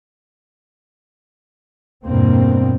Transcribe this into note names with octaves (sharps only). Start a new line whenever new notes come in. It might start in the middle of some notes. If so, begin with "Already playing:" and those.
E2 G2 B2 A#3 C4